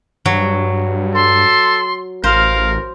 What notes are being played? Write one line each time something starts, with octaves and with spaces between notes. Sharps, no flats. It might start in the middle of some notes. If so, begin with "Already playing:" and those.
G2 F#3
A4 C6
A1 A#4 C5 F5